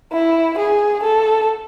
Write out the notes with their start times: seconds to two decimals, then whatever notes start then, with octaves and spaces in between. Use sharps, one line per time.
0.12 E4
0.58 G#4
1.04 A4